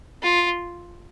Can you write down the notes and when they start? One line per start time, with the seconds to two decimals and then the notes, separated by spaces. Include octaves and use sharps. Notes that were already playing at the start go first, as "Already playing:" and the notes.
0.23 F4